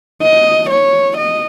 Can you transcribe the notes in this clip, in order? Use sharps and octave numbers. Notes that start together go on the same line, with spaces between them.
D#5
C#5
D#5